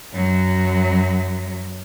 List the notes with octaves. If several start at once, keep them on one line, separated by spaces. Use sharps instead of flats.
F#2 F#3